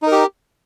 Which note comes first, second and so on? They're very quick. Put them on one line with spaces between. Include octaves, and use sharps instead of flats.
D#4 A#4 G4